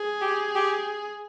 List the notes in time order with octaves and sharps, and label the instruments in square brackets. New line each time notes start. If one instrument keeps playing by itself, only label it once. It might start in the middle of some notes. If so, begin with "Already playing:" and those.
Already playing: [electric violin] G#4
[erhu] G4
G4